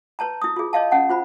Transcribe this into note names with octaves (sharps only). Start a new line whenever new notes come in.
B4 C#5 A5 A#5
E4 D#6
F4 G#4
C#5 D#5 F5 A5
C#4 F#5 A5
F4 C5 B5